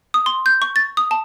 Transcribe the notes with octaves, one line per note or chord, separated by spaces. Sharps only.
D#6
C6
G6
C#6
A6
D#6
A5